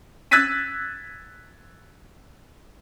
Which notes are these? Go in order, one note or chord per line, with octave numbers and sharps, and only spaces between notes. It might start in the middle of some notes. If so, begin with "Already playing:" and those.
E6 F#6 G#6 A6 B6 D#7